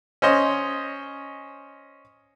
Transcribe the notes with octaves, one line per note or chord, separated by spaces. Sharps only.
C#4 C5 D#5